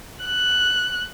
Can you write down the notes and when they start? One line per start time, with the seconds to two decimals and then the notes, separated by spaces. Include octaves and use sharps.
0.23 F#6